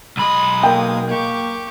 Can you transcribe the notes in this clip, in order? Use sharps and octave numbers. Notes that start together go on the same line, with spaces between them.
B1 G#3 B5 D#6
A#3 G5
A#3 G4 C#6